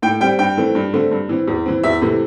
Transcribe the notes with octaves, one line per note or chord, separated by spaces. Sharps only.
A2 G5
G3 C4 G5
G2 G5
E3 A3 C4
G2
D3 A3 C4
G2
E3 C4
E2
E3 C4
E2 E5
C3 E3 A3